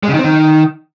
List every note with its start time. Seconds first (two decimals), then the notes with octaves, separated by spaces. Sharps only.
0.03 G#3
0.08 C#3
0.14 D#3
0.19 C4
0.24 D#3